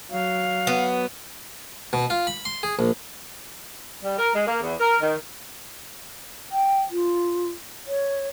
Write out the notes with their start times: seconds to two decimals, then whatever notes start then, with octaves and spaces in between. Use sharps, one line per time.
0.11 F#3 F5
0.67 B3
1.93 B2
2.10 F4
2.27 B5
2.45 C6
2.63 G#4
2.79 A#1
4.03 G3
4.18 A#4
4.34 G#3
4.47 A#3
4.62 E2
4.79 A#4
5.02 D#3
6.52 G5
6.91 F4
7.87 C#5